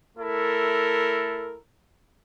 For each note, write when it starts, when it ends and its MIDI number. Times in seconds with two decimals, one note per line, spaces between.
0.18 1.56 57
0.18 1.56 64
0.18 1.56 69
0.18 1.56 70